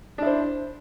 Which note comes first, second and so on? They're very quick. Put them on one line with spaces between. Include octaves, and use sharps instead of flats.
D4 E4 C5